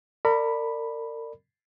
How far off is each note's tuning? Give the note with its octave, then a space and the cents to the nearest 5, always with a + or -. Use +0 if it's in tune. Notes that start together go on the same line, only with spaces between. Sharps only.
A#4 -35 D5 +15 B5 +0